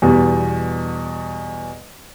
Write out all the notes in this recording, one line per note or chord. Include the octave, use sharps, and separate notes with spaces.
E2 B2 G3